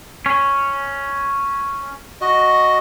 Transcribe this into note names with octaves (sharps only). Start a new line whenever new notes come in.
C#4
F#4 D#5